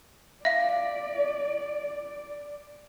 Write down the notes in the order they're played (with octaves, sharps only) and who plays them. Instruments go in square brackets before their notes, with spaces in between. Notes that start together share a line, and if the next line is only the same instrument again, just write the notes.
[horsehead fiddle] D5 [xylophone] E5 F5